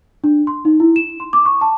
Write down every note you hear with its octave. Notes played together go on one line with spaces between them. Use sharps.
D4
C6
D#4
E4
E7
C6
D6
C#6
A5